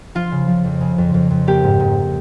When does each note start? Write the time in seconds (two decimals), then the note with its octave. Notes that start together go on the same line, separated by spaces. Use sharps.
0.15 F3 F4
0.32 C#3
0.48 F3
0.64 F2
0.81 C#3
0.98 F2
1.14 F2
1.30 F2
1.47 A#3 G4
1.64 G#2
1.80 G#2